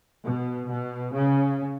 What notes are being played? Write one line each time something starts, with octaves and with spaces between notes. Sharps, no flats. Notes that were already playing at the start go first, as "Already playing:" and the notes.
B2
B2
C#3